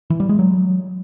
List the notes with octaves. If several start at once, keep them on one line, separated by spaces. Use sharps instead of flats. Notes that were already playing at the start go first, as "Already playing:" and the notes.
E3
G3
G#3
F#3